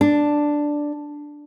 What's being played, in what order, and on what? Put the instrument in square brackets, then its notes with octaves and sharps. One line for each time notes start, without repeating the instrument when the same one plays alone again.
[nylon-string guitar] D4